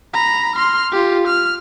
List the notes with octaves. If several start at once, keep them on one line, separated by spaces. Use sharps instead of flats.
A#5 B5
C6 F6
F4 G4
F6